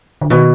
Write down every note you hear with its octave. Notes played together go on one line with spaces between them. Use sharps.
D3
B2 D#3